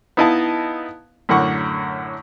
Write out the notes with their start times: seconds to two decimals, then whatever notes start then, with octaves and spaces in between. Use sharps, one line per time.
0.17 B3 D#4 E4 D#5 F5 A5
1.29 F#2 A2 D3 A#4 F#5 C#6